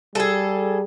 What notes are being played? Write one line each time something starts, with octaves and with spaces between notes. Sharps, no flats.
G3 G#4 A4